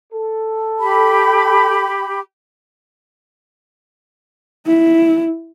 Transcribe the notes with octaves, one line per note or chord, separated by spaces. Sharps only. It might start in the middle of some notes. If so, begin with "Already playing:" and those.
A4
G4 B5
E4